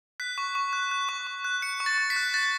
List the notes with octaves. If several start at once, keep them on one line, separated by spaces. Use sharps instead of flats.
F#6 B6
C#6
C#6
F#6
F#6
C#6
C#6
F#6
F#6 C#7
C#6
A6
C#6
B6
F#6
F#6 A6